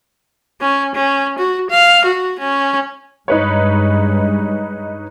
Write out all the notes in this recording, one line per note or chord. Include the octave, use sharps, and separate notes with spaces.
C#4
C#4
F#4
F5
F#4
C#4
G2 G#3 D#4 B4 C#5